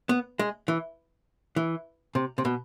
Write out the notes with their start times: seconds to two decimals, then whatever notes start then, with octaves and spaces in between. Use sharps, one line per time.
0.09 B3
0.39 G#3
0.68 E3
1.56 E3
2.15 C3
2.38 C3
2.45 B2